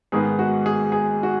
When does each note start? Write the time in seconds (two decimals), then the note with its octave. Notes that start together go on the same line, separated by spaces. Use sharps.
0.12 G#2 D#3 G#3 B3 G#4
0.39 F#4
0.66 G#4
0.92 G#4
1.23 F#4